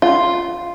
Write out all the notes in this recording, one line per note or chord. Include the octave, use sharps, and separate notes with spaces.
F4